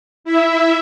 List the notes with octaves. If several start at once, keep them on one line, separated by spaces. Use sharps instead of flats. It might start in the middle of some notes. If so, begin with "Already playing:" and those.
E4 E5